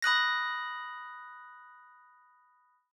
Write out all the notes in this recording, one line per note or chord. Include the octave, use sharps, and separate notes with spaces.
B5 D#6 F#6 A#6